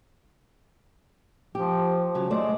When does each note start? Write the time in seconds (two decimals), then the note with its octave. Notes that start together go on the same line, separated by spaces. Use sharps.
1.55 F3 G4
2.15 C#3 F#3 F#4
2.30 G#3 A3 C5 D5